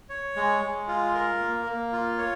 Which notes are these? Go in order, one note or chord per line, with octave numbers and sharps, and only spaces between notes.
C#5
G#3
G#3
F4
A#4
A#3
A#3
F4
C#5